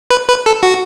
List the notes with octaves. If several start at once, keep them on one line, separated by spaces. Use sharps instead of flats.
B4
B4
A4
F#4